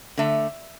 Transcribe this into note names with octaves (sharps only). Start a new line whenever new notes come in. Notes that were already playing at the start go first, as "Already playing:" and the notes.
D3 A3 E5